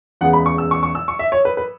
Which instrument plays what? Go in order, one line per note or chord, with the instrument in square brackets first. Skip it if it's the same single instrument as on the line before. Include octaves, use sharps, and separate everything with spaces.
[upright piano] E2 C#3 G#3 B3 F#5
B5
C#6
E6
C#6
C#6
E6
C#6
E5
C#5
B4
B4